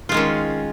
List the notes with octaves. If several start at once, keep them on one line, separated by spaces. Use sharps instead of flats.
D#3 G#3 C#4 F4